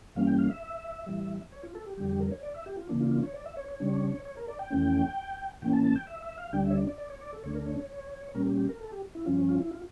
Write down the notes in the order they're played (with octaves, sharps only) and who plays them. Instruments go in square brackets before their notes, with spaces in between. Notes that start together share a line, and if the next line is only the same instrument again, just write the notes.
[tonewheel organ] G2 E3 G3 A#3 C#4 F5
G5
F5
E5
A2 E3 G3
C#5
F4
A4
G4
F2 D3 G3 G4
G4
A#4
C#5
D5
E5
G4
F4
C#3 E3 A#3 D4
F4
F4
C#5
D5
E5
C#5
C#5
C#3 G3 D4
C#5
A#4
D5
G5
F2 E3 A3 C#4
A2 E3 A#3 C#4 G5
A5
A5
G5
E5
E5
F5
D2 D3 G3 D4 G5
E5
C#5
D5
D5
D5
C#5
D5
A4
D2 D3 A3 D4 C#5
A#4
C#5
C#5
A#2 G3 C#4 A#4
G4
G4
A#4
A4
G4
E4
G2 F3 C#4 F4
F4
E4
F4